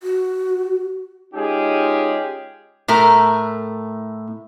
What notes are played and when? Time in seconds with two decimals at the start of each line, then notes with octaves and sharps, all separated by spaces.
0.03 F#4
1.34 G#3 C#4 D#4 F4 G4 G#4
2.88 A2 A3 A#4